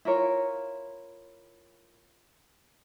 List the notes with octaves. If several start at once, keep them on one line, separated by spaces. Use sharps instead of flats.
E4 F4 A#4 C#5